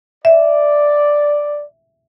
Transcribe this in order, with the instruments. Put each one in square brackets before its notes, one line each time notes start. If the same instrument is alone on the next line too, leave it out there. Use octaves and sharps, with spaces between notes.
[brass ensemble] D5 [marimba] E5